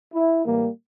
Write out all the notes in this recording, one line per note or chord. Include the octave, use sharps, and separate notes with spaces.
E4
A2 E3 G3 A#3